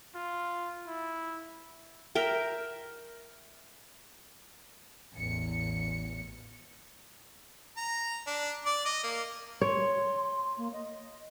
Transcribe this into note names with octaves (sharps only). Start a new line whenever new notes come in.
F4
E4
A#4 E5 G5
A1 E2 C#7
A#5
D4
D5
D#5
A#3
C#5 C6
A#3
D#5